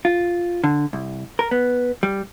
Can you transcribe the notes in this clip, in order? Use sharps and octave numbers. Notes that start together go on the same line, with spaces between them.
F4
D3
C2
A#4
B3
G3